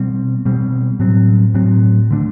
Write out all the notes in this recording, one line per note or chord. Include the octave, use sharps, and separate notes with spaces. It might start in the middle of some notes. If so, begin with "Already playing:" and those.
Already playing: B2 G3 C4
B2 G3 C4
A2 F#3 C4
A2 F#3 C4
D3 A3 D4